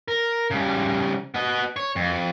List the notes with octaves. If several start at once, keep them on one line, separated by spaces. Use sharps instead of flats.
A#4
C#3 G3
B3 D#5
C#5
F2